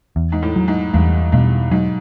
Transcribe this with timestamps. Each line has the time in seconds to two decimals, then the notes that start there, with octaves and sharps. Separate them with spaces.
0.16 E2
0.32 G#2
0.42 A2
0.56 F#3
0.68 G#2
0.94 E2 G2
1.32 G2 B2
1.71 G#2 F#3